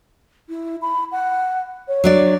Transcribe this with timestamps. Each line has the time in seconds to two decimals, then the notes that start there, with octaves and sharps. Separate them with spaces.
0.49 E4
0.82 B5
1.12 F#5
1.88 C#5
2.04 F#3 D4 D5